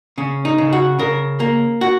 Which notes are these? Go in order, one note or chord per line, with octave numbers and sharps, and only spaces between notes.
C#3 C#4
D#4
C#3
F#4
C#3 A#4
A#3
F#4